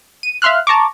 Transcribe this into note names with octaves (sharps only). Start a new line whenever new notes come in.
D#7
E5 F5 C6 F6 F#6
A5 A#5 C#6 D6